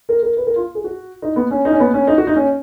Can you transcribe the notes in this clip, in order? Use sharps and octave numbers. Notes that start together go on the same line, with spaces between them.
A#4
A#4
B4
A#4
F4
G#4
F#4
D#4
B3
C#4
D#4
C#4
B3
C#4
D#4
F#4
D#4
C#4